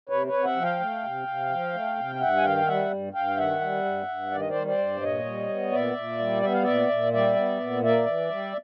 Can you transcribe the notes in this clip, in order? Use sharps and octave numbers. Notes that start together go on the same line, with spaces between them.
C3 B4 C#5
B4 C#5
C3
E5 F#5
F3
F5 G5
A3
C3
C3
F3
A3
C3
F5
G2 E5 F#5
G#5
D#3 F5 G5
G3 E5 F#5
G2
G2 F5 G5
D#3 E5 F#5
G3
G2
G2
D#3 D5
D#5
C5 D5
G3
C5 D5
G2
A#2 C#5 D#5
G3
B3
A#2 D5 E5
A#2
G3
B3 E5
F5
A#2 D5 E5
A#2
G3 D5 E5
B3
A#2
A#3 D5 E5
E3
G3